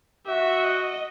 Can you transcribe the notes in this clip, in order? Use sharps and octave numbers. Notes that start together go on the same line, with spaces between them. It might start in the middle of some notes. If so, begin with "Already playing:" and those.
F#4 E5
D#5